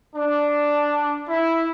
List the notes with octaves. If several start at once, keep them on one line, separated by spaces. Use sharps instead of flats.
D4
E4